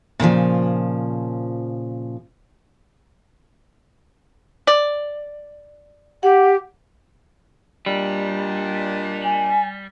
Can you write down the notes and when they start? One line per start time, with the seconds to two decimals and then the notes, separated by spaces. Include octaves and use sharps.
0.20 A#2 C#3 E3 F3
4.67 D5
6.23 G4 F#5
7.86 A#2 G3 D4 D#5
9.23 G#5